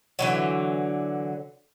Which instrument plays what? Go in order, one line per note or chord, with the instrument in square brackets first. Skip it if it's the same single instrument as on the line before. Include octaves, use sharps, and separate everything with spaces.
[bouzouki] D3 E3 F#3